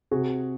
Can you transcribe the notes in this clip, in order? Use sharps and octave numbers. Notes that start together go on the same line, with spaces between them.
C3 F#4 G#4